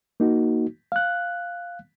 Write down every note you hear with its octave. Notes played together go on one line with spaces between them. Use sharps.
A#3 D#4 F#4
F5 F#6